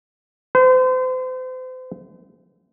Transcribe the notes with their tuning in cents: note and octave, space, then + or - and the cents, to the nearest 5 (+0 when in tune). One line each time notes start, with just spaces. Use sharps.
C5 -40